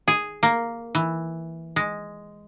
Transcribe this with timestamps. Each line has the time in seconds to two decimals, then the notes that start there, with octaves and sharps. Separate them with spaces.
0.08 G#4
0.43 A#3
0.95 E3
1.76 G#3